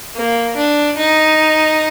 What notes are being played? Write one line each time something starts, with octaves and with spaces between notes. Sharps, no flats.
A#3
D4
D#4